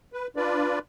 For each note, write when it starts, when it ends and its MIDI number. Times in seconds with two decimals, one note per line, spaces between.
0.13 0.27 71
0.36 0.79 62
0.36 0.79 65
0.36 0.79 71
0.36 0.79 74